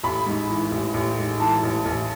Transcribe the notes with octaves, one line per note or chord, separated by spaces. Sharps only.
A1 B5
G#2
E3
A1
A1
G#2
E3 A5
A1
A1